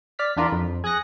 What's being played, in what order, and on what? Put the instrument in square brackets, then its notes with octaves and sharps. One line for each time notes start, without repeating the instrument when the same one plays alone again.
[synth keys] D5 F6 B6
E2 D4 F4 A#4 B5
F2
G#4 D#6 F#6 A#6 C#7